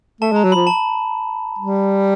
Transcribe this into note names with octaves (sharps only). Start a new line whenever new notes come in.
A3 A5
G#3 A#5
F#3
B5
F3
A5
G3